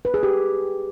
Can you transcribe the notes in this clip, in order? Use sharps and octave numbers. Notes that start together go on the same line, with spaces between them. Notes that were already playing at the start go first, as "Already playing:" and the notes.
B4
G#4
G4